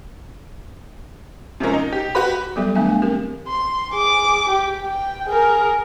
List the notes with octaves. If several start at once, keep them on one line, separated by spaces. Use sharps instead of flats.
C3 F3 G#3 C#4 A#4
D#4
G4
F#4 G4 B4 B5
F#3 G3 B3 G4 A4 E5
D#3 A3 B3 D4 E5 G#5
G#5
C4 G4 A#4
C6
G#4 D6
G4
G5
G#4 A#4